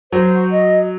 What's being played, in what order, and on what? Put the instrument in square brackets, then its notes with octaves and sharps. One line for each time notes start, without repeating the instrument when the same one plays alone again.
[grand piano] F#3 [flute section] C5
[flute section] F#4
D#5